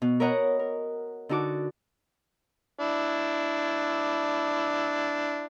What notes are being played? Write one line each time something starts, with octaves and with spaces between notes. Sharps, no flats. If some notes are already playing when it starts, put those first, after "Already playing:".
B2
A#4 B4 C#5 D#5 F#5 A#5
A#4
D3 D#4 F#4 A5 D6
D4 E4